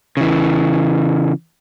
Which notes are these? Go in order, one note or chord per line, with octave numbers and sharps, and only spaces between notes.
C#3 E3